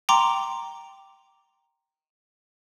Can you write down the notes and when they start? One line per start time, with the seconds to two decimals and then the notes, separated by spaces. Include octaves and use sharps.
0.09 G5 A#5 C6 D6